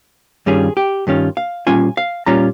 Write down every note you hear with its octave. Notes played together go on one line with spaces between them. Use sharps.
G2 D#3 G3 C#4 F4 G#4
G4
G2 D#3 G3 C#4 F4
F5
A#2 G3 C#4 F4 G#5
F5
A#2 G3 C#4 F4 A#5